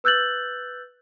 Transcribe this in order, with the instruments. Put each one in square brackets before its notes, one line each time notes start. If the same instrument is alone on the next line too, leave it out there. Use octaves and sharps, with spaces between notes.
[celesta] B4 E6 F#6 G6 A6 F#7